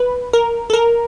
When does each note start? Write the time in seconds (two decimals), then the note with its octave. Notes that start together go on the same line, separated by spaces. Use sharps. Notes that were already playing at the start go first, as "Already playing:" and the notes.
Already playing: B4
0.33 A#4
0.70 A4
0.73 A#4